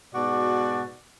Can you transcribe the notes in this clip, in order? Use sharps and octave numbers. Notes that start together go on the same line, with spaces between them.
G#2 B2 F#4 D5